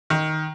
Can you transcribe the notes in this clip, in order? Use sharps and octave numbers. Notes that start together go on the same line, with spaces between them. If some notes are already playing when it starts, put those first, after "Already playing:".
D#3